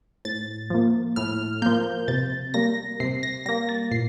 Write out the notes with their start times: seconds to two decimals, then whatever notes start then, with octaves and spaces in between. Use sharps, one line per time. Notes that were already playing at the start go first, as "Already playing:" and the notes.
0.25 A2 A6
0.70 F3 A#3
1.16 A2 F6
1.62 F3 A#3 G6
2.08 C3 A6
2.54 G3 A#3 A#6
3.00 C3 C7
3.23 A#6
3.46 G3 A#3 A#6
3.69 A6
3.91 A#2 C7